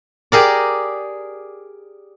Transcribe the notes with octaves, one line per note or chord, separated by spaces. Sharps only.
G4 G#4 A#4 D5